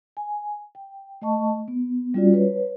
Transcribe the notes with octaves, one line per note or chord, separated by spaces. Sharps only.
G#5
G5
A3 D#5 A5 C#6
B3
G3 C#4 F4 F#4 D5
B4 C#5